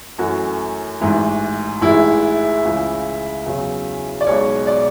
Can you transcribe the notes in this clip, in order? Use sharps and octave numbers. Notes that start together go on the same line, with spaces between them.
F#2 E3 A3 F#4
A1 G#2 E3
A1 G#2 E3 G#3 E4
C#2 C#3 E3
E2 C#3 F#3
D5
B1 B2 G#3 C#5
D5